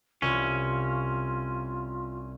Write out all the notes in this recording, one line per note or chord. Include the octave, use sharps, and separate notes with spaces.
C2 C#4 F4